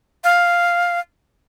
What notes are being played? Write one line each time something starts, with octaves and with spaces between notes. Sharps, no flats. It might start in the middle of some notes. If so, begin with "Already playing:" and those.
F5